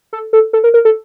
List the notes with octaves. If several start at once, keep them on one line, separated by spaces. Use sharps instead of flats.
A4
A4
A4
A#4
A#4
A4